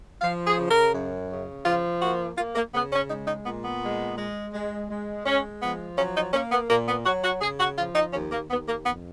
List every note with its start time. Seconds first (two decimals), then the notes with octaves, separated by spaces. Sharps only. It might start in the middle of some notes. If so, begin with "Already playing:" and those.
0.22 F3 F5
0.47 G#4
0.58 C#3
0.71 A#4
0.95 F#2
1.30 C#3
1.66 F3 F4
2.02 A#3 F#4
2.38 A#3 F4
2.56 A#3
2.75 C#3 B3
2.93 C#4
3.10 G#3 D#4
3.28 D#4
3.46 A#2 B3
3.65 B3
3.82 G#3
4.18 G#3
4.54 G#3
4.90 G#3
5.26 G#3 C#4
5.62 F3 B3
5.98 F#3 C#4
6.16 D#4
6.34 A#3 C#4
6.52 B3
6.70 A#2 A#3
6.89 B3
7.06 F#3 F#4
7.24 F#4
7.42 C#3 G#4
7.60 F#4
7.78 F3 F4
7.96 D#4
8.14 D#2 C#4
8.32 A#3
8.51 D#2 B3
8.69 A#3
8.86 F2 B3